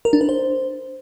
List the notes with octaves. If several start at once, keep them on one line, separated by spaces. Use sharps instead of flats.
A#4
D4
B4
C5